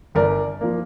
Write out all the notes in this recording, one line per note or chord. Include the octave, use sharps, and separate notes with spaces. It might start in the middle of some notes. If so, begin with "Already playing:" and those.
G1 A#4 D5
F3 A#3